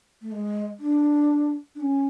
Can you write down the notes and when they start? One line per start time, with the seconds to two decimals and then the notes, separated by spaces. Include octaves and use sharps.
0.21 A3
0.32 G#3
0.80 D4
1.75 D4
1.80 C#4